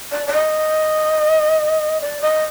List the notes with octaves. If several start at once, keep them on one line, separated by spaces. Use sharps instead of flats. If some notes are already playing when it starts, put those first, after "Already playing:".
D5
D5
D#5
D5
D#5